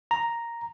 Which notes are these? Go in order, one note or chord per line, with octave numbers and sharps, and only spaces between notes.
A#5